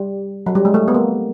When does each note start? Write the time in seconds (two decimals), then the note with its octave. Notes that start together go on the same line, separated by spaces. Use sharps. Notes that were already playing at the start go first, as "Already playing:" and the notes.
Already playing: G3
0.46 F#3
0.55 G3
0.65 G#3
0.74 A3
0.88 B3
0.95 A#3